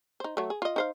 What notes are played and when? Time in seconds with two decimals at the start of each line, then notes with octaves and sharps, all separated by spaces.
0.20 D#4 C5
0.37 F#3 A3
0.50 G#4
0.62 F4 D#5
0.76 D#4 C5 F5